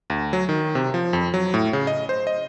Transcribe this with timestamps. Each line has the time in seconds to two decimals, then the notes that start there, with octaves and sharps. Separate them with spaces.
0.10 D2
0.33 F#3
0.49 D#3
0.75 C3
0.94 F3
1.13 F2
1.34 F#3
1.54 A2
1.73 C#3
1.87 D#5
2.09 C5
2.27 D#5